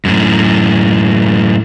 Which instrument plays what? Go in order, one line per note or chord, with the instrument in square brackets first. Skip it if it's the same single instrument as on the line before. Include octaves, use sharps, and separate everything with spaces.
[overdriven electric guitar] F#2 A2